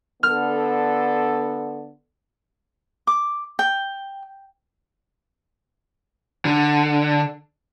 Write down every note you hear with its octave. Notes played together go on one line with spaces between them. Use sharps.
D3 B3 A4 F6
D6
G5
D3